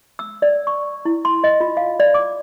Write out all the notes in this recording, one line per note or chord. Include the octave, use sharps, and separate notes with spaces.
E6
D5
C#6
E4
C6
D#5
F4
F5
D5
D6